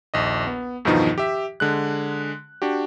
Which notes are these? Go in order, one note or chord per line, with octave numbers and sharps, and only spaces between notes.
A#1 D#2 D#5
B3
E2 G2 B2 D#3 F3 D#4
G4 E5
D3 G#3 F#6
D4 F#4 G4